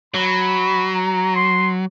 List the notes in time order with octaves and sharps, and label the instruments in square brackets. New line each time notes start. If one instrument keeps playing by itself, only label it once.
[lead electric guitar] F#3 [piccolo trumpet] B5
[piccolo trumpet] A#5
C6